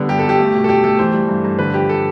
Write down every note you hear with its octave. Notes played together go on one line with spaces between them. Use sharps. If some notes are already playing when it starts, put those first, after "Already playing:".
Already playing: D3 G3 B3
G2 G4
G2 A4
G4
A3
B2
A4
B2 G4
A3 A4
E3 C5
G3
G2
G2
D3 B4
F3 G4
A4